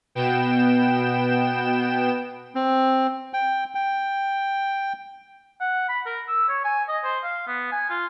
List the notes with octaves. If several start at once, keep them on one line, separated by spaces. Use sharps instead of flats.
B2 B3 G5 E7
C4
G5
G5
F#5
B5
A#4
E6
C#5
G#5
D#5
C5
F5
B3
G#5
F4